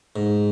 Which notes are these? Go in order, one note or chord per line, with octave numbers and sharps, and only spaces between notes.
G#2